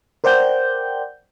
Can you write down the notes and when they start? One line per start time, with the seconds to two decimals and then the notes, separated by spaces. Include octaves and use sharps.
0.24 A#4 C5 D5 F#5 G5 G6